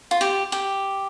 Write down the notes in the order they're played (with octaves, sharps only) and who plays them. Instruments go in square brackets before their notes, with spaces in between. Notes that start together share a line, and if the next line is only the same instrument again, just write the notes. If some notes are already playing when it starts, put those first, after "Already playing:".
[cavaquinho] F4
G4
G4